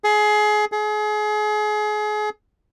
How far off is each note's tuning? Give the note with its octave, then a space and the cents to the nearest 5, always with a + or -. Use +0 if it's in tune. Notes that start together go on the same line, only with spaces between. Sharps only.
G#4 +25
G#4 +30